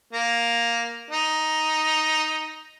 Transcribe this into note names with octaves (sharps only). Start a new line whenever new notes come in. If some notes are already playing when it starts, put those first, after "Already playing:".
A#3
D#4